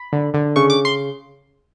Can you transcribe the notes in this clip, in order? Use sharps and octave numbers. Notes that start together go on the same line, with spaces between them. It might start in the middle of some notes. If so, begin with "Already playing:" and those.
Already playing: B5
D3
D3
C#3 C#6
D6
C6